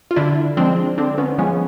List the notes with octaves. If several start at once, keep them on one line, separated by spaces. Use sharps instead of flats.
F4
D3 D4 E4
F3 G#3 C4 D4
D3 C4 D4
B3 C#4
F3 G#3 B3 C#4